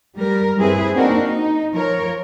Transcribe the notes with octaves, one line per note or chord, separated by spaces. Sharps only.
G3 A#4
G2 C4 E4 G#4 B4
A#3 C4 D4 D#4 F#4 A#4
D#4
F3 A#4 C#5